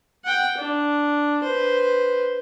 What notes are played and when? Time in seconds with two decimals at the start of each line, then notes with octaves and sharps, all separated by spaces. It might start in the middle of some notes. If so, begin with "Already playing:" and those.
0.24 F#5 G5
0.57 D4
1.43 B4 C5